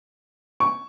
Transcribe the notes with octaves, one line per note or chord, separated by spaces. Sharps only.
C#6